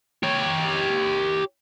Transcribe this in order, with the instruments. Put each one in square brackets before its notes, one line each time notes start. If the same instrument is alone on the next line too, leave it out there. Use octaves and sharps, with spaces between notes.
[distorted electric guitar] G4 C#5